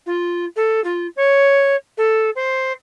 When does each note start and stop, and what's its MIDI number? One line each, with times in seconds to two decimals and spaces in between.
0.06 0.45 65
0.56 0.82 69
0.84 1.07 65
1.16 1.76 73
1.97 2.30 69
2.35 2.72 72